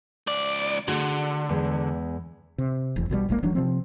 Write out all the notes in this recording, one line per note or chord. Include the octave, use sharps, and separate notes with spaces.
C#2 D5
D3 A3 F#4 G#4
E2 G#3
C3
F1 E2
B1 B2 D3 G3
D#1 A1 G#3 A#3
D#1 E3 F#3 D4
C3 F3 C4